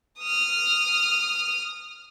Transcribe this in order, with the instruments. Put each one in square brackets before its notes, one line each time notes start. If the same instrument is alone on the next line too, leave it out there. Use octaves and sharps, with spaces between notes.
[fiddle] D#6 F6